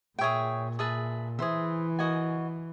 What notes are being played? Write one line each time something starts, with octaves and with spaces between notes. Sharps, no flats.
A#2 G#4 C#5 E5 G5
G#4 B4 E5 A5
E3 G#4 C5 E5
F#4 A#4 D#5 G#5